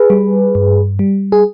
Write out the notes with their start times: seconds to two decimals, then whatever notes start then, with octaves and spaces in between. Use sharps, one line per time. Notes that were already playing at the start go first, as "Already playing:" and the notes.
Already playing: G#4 B4
0.10 G3
0.55 G2
0.99 G3
1.32 G#4